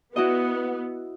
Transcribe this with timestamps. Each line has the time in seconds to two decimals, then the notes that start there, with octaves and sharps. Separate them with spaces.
0.16 B3 E4 F#4 D#5